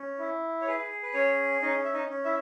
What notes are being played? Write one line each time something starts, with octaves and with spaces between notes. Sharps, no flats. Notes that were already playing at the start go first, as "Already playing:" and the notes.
Already playing: C#4
E4
C#5
G#4 B4
B4
C#4 C#5
C#4 D#4 D#5
E5
D#4 D#5
C#4
E4 E5